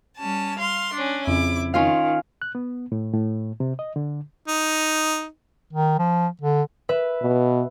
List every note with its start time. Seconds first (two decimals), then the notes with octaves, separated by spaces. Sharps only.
0.18 G3 C#4 A5
0.59 F5 C6
0.93 C#4 D4
1.27 F2 C#3 E4 D6
1.74 D#3 C#4 F4 F5
2.42 F#6
2.55 B3
2.92 A2
3.14 A2
3.60 C3
3.79 D#5
3.96 D3
4.48 D#4
5.73 D#3
5.99 F3
6.42 D3
6.89 B4 E5
7.22 B2